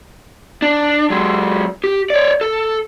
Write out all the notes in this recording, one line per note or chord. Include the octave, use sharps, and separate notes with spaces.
D4
F#3 G#3
G4
C#5 D5
A4